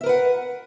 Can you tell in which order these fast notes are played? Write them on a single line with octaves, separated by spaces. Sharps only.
E5 A#4 B4 F#5